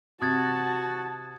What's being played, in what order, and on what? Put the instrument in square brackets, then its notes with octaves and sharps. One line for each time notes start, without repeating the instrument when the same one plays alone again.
[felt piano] C3 [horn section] F#4 [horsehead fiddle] A5 [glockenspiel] D#6 G#6 A6